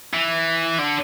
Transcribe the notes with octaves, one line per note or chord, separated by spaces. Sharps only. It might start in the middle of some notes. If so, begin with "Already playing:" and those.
E3
D3